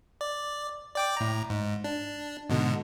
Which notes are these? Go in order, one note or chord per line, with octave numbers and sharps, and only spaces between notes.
D5
D5 G5 D6
A2 A#5
G#2
D4
G#2 B2 D3